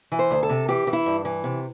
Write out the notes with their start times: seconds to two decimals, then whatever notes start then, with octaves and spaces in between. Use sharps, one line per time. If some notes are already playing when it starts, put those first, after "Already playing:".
0.12 E3
0.19 C5
0.31 D2
0.43 A4
0.49 C3
0.69 E3 G4
0.87 E3
0.93 E4
1.06 G2
1.25 E3
1.44 C3